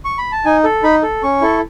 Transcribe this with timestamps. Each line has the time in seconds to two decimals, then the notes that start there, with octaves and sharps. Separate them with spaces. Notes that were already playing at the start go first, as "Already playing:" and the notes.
0.05 C#6
0.18 B5
0.32 A5
0.45 D#4 G#5
0.64 A4
0.83 D#4 B5
1.03 A4
1.23 C#4 C#6
1.42 E4 A4